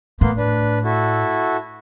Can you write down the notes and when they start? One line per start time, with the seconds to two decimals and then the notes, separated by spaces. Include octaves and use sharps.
0.21 A2 A#3 B3 C6
0.37 D4 B4
0.85 E4 F#4 A4